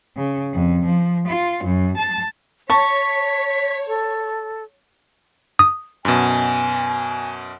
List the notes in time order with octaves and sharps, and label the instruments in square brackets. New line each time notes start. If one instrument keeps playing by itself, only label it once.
[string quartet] C#3
F2
F3
F4
F#2
A5
[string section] C#5 [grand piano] A5 [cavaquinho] C#6 [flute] B6
[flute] A4
[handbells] D#6
[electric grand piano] F#2 B2 [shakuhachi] G#5